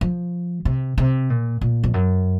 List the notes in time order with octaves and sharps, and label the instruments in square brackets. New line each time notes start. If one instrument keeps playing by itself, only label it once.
[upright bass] F3
C3
C3
A#2
A#2
F2
F#2